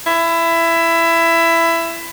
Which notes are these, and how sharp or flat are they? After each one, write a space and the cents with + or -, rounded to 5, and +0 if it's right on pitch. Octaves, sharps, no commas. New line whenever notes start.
E4 +15